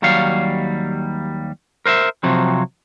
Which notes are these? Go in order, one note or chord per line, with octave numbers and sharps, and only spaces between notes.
D#2 F#3 G3 C#5 F5
A#4 C5 D#5 E5
C3 F3 F#3 C4